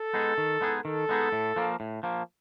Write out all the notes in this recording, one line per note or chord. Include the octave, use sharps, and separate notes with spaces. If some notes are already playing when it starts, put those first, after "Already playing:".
Already playing: A4
G#3 B3 D#4 G#4
D#3
G#3 B3 D#4 G#4
D#3 A4
G#3 B3 D#4 G#4
A2
F3 A#3
A2
F3 A#3